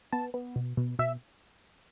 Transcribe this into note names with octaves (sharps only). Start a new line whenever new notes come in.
B3 A5
B3
B2
B2
B2 E5